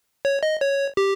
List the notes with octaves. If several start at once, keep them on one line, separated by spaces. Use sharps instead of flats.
C#5
D#5
C#5
G4